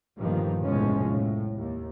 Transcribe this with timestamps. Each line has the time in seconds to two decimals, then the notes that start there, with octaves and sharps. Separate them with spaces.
0.17 G1 G2 A#2 D#3 F3
0.61 F1 B1 A2 F3 G#3 C#4
1.10 A2
1.58 D#2